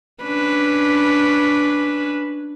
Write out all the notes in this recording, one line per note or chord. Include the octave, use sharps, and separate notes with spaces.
C#4 D4 B4